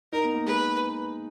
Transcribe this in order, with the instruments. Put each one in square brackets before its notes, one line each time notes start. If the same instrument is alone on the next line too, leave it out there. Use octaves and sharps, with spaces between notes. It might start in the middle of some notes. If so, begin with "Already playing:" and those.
[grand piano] D#4 [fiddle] A#4
[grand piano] B3
A#3
[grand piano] G#3 [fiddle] B4